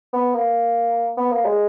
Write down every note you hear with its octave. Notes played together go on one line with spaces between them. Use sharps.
B3
A#3
B3
A#3
G#3